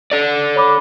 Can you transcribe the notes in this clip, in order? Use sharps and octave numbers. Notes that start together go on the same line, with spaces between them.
A4 D5
C#5 B5 D6